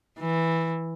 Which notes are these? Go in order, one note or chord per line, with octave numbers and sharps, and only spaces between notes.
E3